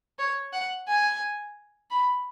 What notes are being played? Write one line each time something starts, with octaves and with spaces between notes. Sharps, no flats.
C#5
F#5
G#5
B5